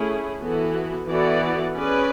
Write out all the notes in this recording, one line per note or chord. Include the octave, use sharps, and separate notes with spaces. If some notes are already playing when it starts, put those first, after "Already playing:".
Already playing: A3 C#4 E4 G#4
E3 B3 F#4 A4
E3 B3 F#4 A4 D5
C#4 G#4 B4 D5